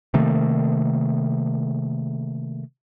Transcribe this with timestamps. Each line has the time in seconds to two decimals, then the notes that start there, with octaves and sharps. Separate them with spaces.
0.14 C3 D#3 A3 A#3